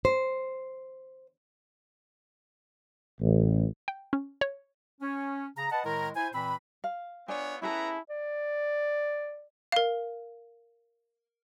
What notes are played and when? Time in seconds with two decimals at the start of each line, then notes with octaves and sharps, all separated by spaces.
0.05 C5
3.20 A1
3.88 G5
4.13 C#4
4.41 C#5
5.01 C#4
5.58 C#3 A#5
5.72 B4 D#5 F#5 A5
5.85 A2 D#3 G#3 E4 A#4 A#5
6.15 E4 C5 G#5
6.34 A#2 E3 C4 B5
6.84 F5
7.28 B3 D4 F4 C#5 G#5
7.62 B3 C#4 E4 G#4 A4 B4 A#5
8.10 D5
9.72 A#4 F5